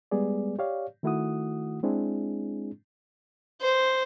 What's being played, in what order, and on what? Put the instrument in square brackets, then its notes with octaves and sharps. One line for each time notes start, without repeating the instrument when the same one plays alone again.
[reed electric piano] G3 G#3 B3 G#4 D5
G4 C#5 D5 F5
D#3 A3 E4 F#4 F#5 D#6
G#3 C4 D4 E4 G#4
[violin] C5